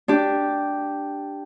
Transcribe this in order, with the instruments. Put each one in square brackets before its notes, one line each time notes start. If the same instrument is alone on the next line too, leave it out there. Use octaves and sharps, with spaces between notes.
[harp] D4 G4